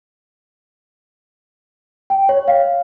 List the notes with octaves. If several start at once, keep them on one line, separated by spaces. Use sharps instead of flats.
G5
C#5
F5